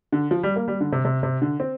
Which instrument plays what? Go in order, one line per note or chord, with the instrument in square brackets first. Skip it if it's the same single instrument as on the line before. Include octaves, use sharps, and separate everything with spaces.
[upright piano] D3
F3
G3
A#3
G3
D3
C3
C3
C3
D3
C4